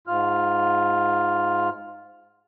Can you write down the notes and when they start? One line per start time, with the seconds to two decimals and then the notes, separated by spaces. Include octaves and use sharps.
0.07 G#2 F4 F6